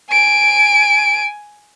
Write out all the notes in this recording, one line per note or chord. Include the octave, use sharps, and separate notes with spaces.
G#5 D7